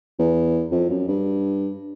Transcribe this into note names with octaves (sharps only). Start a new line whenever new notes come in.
E2
F2
F#2
G2